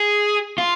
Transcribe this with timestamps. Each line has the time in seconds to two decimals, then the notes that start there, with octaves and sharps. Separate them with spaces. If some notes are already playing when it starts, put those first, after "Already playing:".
Already playing: G#4
0.58 F4